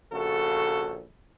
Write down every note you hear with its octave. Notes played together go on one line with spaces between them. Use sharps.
A#1 C#3 F#4 A4